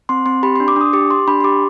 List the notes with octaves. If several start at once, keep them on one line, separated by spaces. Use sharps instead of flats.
C4 C6
C4 C6
G4 B5
D4 C6
D6
D4 D#6
G4 D6
G4 C6
D4 B5
C6
G4 D6